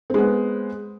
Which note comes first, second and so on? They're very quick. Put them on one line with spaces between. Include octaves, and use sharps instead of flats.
C4 G#3 B3